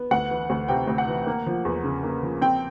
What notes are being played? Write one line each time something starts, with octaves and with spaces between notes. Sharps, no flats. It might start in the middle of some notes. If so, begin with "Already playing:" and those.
Already playing: B3
D2 F#5
E3
D2
C3 G5
D2
F#5
E3
A#3
F3
E2
C#3
A#3
F3
C4 G5